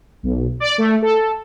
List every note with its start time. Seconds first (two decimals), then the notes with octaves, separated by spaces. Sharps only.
0.23 B1
0.60 D5
0.78 A3
1.02 A4